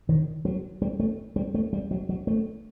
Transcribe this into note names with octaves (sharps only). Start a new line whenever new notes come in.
D#3
F#3
G3
A3
G3
A3
G3
F#3
F#3
A3